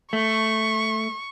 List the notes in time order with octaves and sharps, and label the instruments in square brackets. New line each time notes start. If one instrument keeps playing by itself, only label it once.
[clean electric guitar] A3 [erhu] C#6